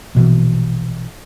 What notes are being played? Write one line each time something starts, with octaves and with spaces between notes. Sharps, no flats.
A#1 B2 E3